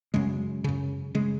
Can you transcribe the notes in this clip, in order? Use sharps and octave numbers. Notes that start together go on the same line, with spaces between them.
F#2 C#3 G#3
F#2 C#3
C#3 G#3